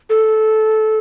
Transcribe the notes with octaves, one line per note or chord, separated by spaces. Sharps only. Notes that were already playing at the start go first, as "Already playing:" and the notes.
A4